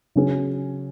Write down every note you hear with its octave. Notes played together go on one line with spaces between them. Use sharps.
C#3 F#3 C#4 G#4